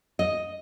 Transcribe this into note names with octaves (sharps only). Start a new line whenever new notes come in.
D#5